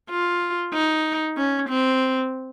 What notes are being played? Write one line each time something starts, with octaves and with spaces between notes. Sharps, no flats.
F4
D#4
C#4
C4